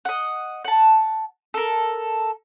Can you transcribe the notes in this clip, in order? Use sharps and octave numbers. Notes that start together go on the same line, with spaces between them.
D#5 F#5
F#5 A5
A4 A#4